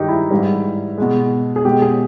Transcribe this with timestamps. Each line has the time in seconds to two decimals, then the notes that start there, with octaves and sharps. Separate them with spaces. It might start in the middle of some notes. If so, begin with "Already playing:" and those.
Already playing: G2 D#3 G#3 D#4 G4
0.08 E4
0.31 G#2 E3 G3
0.98 B2 G#3
1.56 G#4
1.65 B2 G#3 G4
1.82 G#4